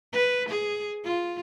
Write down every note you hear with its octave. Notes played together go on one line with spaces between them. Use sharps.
B4
G#4
F4